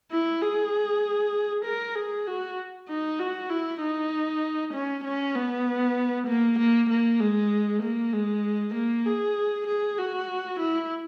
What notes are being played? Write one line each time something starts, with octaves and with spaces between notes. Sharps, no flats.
E4
G#4
A#4
G#4
F#4
D#4
F#4
E4
D#4
C#4
C#4
B3
A#3
A#3
A#3
G#3
A#3
G#3
A#3
G#4
G#4
F#4
E4